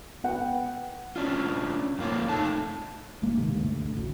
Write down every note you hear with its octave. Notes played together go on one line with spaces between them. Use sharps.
B3 F#5 G5
C#4 D4 F4
F2 A#3 F4 C#5
A3 D#4 A5
G1 G2 G#3 A#3
G#2 C3 D#3
D2 G2 D3 A3
A1 D2